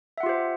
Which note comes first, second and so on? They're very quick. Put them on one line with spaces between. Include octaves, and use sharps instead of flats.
E5 F#5 F4 G4 C5